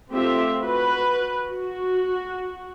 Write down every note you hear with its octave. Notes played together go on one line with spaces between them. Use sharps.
A3 C4 F4 G4 E5
F#4 B4
F#4